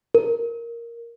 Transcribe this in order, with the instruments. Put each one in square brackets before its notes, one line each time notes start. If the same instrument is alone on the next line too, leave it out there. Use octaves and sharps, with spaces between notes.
[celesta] A#4